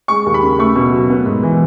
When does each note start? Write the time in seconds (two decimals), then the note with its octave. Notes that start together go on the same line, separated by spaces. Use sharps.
0.08 G#3 C#6
0.26 D#2
0.34 B5
0.43 C#3
0.59 A3 C#6
0.75 B2
0.93 F#3
1.10 B3
1.26 G#2
1.43 E3